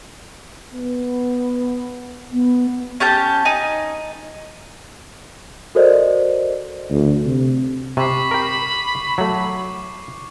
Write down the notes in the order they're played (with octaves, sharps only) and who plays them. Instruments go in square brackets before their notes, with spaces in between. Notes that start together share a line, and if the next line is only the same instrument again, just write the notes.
[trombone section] B3
[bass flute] B3
[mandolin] C#4 G4 A5 G6
D#4 G#5
[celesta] F#4 A4 A#4 C5 D5 D#5
[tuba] D2
C3
[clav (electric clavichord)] C3 [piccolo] B5 [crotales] C#6 D6 C7
[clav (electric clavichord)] G4 A#4
F#3 A3